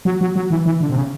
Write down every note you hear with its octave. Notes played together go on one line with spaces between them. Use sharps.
F#3
F#3
F#3
E3
E3
D3
C3
C#3